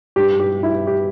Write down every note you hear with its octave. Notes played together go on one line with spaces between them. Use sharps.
G2 G3 G4
G4
E4
G4